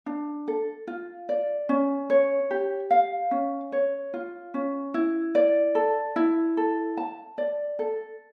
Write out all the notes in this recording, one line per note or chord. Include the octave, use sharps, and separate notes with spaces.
D4
A4
F4
D5
C#4
C#5
G4
F5
C#4
C#5
F4
C#4
E4
D5
A4
E4
A4
A5
D5
A4